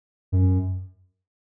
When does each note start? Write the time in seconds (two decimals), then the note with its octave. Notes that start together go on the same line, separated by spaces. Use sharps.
0.32 F#2